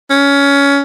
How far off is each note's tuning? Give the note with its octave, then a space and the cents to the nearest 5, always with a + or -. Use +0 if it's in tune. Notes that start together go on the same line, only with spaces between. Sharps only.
C#4 +20